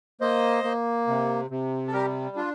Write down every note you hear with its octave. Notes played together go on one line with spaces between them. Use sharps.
A#3 C5 D#5
A#3
C3
C3
A4
G3 G4 A#4
D4 F4